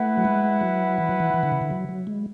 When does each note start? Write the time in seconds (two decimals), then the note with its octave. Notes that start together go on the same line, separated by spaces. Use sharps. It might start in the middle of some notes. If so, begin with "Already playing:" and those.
Already playing: A3 E4 B4 F#5
0.17 F#3
0.25 G#3
0.61 F#3
0.98 E3
1.09 F#3
1.20 E3
1.34 E3
1.43 D3
1.52 C#3
1.62 D3
1.70 F#3
1.89 F#3
2.07 G#3